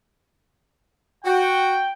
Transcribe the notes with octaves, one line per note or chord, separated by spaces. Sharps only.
F#4 G5